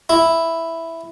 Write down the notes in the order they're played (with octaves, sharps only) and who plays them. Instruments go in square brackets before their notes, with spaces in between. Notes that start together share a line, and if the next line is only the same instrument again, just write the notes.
[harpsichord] E4